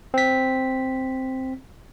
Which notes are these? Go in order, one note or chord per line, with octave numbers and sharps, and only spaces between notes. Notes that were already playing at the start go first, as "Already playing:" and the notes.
C4 B6